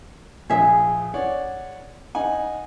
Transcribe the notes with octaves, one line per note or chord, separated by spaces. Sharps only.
A#1 G#4 E5
C#5 D5 F#5
D#4 F#5 G#5